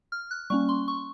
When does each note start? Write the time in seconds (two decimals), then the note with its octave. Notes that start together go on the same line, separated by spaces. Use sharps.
0.12 F6
0.31 F#6
0.50 G3 A#3 C#4 C#6
0.69 C6
0.88 C#6